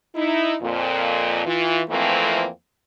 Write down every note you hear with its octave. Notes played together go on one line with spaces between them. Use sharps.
D#4 E4
F2 A#2
E3 F4
F2 E3 F3 A3 A#3 C4